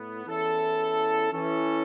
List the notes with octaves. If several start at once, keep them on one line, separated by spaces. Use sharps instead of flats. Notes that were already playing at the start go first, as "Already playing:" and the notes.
Already playing: A2 B3
E2 E3 C#4 E4 A4
E3 C#4 A4